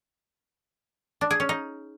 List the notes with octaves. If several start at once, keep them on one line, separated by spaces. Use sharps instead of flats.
D4
G#4
C#4
D#4